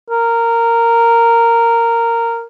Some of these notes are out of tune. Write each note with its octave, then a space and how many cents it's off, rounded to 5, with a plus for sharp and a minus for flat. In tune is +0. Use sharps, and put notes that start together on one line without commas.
A#4 -10